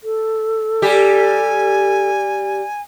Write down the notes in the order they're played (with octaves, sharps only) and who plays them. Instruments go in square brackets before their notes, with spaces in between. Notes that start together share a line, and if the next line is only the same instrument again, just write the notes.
[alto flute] A4
[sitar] G3 G4 [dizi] G#5